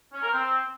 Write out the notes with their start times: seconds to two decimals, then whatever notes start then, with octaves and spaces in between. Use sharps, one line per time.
0.12 C#4
0.22 A#4
0.32 C4